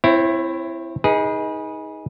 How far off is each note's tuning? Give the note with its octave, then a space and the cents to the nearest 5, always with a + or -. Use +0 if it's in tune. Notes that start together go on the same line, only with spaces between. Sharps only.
C4 +0 E4 +15 C#5 -35
D#4 +20 G#4 -5 B4 -30